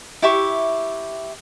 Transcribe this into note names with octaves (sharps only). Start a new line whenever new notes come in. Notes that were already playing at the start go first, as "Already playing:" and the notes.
E4 G4 E5 C#6